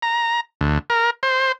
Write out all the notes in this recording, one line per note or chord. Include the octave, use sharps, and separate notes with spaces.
A#5
D2
A#4
C5